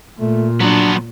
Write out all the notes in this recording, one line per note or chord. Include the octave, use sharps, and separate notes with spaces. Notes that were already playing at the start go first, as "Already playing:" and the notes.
A#2 A3
F3 F#3 B3 D4